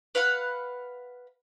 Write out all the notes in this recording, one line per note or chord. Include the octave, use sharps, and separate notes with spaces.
B4 F5 F#5 B5